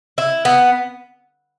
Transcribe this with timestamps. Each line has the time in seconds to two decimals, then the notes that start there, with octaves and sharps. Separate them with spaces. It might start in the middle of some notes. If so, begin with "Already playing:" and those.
0.18 E4
0.45 B3